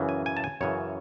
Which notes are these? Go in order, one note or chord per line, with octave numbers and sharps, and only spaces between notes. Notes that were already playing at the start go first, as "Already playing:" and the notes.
Already playing: F#2 C#3 E3
G#5
G#5
A5
G#5
F#2 C#3 E3 C#5